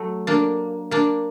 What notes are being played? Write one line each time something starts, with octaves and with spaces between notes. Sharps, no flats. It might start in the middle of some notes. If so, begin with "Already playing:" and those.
Already playing: F#3 A3
A#3 D4
A#3 D4